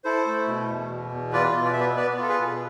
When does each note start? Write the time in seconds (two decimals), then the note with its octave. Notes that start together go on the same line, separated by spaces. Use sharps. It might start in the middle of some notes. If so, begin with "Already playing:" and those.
0.04 E4 A4 C5
0.26 A3
0.48 B2
0.69 E2
0.90 B2
1.12 E2
1.32 F4 B4 D5
1.55 B2
1.65 D5
1.73 E5
1.75 B3 B4 D5
1.96 B3 B4 D5
2.18 F4 A4
2.29 G#4 B4
2.40 B2